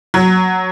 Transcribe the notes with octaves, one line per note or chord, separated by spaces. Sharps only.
F#3